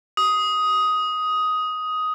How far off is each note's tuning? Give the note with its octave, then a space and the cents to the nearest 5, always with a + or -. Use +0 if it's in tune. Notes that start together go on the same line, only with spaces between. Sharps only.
D#6 +10